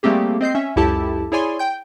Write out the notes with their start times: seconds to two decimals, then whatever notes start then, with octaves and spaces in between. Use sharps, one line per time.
0.03 G3 A3 A#3 C4 G4 G#4
0.41 C4 D#5 G6 C7
0.55 C#4 E5
0.76 C#2 F#2 E4 G4 A4 A5
1.32 E4 G#4 C#5 D5 G#5 C6
1.59 G5 G6